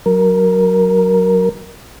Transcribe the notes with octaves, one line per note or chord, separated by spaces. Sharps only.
F#3 A#4